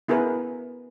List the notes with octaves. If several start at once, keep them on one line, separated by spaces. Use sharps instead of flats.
B3 E4 G#4 A#4 B4